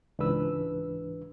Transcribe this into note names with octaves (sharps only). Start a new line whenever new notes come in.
C#2 G#2 E3 D4 B4 E6